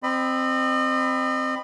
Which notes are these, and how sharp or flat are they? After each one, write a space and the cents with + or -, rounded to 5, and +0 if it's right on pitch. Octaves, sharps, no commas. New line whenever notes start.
C4 +0 D#5 -35 B5 +15